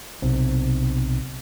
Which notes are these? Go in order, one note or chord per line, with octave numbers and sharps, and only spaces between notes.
B1 C3